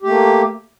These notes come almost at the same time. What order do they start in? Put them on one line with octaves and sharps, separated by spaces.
G4 A3 A#3